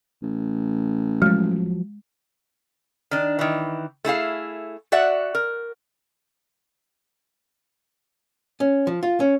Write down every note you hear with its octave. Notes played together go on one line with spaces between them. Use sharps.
A1
F3 F#3 G#3
D#3 D4
D#3 E3
A3 E4 G#4 F5
F#4 D5 E5 F#5
A#4
C#4
F3
F4
C#4